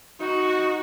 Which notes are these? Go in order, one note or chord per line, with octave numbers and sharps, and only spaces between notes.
D#4 F#4